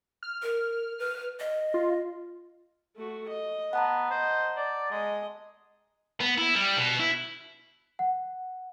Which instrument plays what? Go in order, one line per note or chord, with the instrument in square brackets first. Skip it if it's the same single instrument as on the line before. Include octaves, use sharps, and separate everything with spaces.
[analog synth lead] F6
[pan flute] A#4
B4
D#5
[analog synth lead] F4
[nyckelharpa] A3 F#4
D#5
[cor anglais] B3 [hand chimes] F#5 A5 A#5
[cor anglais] C5 [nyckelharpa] D#5
[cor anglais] D5
[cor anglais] G#3 [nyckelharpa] D#5
[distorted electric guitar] B3
E4
G3
B2
E4
[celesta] F#5